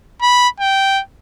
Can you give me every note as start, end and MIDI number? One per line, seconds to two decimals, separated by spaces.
0.22 0.48 83
0.60 1.01 79